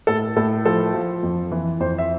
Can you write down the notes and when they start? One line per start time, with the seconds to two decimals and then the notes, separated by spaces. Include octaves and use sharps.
0.07 A2 A4
0.36 A2 A4
0.65 F3 A4
0.94 F3
1.23 F2
1.52 E3
1.80 F2 C5
1.98 E5